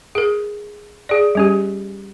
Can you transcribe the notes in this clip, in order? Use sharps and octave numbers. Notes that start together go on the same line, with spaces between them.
G#4 A#4
G#4 D5
G3 C#4 G4